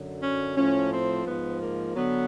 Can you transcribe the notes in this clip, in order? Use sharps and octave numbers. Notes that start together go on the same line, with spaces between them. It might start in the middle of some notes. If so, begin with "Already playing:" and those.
Already playing: F#2 D3 F#3
C#4
A2 F3 C#4
C4
G#2 F3 B3
A#3
D3 F#3 B3